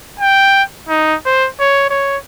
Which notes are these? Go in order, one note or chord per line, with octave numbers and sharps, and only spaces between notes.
G5
D#4
C5
C#5
C#5